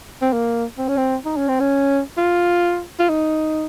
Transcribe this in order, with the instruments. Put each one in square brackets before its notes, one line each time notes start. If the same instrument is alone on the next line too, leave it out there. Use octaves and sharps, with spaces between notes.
[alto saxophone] C4
A#3
C4
C#4
C4
D#4
C#4
C4
C#4
F4
F4
D#4